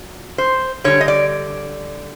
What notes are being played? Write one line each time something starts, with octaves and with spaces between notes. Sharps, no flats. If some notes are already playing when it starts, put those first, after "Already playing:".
Already playing: A#2 F#3
C5
D3 G3 C#5
D#5
D5